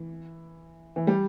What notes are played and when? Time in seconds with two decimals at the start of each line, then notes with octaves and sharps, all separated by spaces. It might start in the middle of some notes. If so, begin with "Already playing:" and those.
Already playing: E3
0.96 E3
1.07 G3